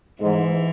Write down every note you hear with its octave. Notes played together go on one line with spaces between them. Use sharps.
G#2 E3